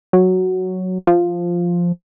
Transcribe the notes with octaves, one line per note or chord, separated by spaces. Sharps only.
F#3
F3